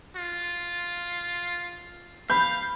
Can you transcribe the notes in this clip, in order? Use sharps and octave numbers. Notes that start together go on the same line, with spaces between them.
F4
F5 B5 G6